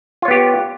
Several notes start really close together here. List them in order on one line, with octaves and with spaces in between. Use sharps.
F4 C#5 B3 G4